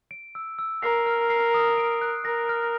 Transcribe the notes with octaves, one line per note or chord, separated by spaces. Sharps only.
D7
E6
E6
A#4 C7
F6
C7
D#6
D7
F#6
A#4 A#6
F6